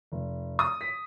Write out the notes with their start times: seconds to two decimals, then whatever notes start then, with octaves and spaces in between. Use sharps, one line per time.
0.12 F1
0.59 D#6
0.81 B6